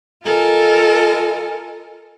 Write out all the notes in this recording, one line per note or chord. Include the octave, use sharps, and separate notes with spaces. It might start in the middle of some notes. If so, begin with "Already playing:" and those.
F4 A4 A#4 D#5 G#5